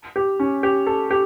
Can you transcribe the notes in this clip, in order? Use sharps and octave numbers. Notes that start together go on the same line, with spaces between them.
G4
C#4
G4
A4
G4